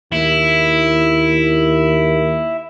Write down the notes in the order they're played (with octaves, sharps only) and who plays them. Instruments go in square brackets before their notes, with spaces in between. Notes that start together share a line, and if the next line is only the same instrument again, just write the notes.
[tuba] D#2 [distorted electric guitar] E4